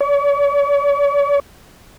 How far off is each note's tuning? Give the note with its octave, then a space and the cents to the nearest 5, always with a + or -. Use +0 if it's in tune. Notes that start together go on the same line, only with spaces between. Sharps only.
C#5 +45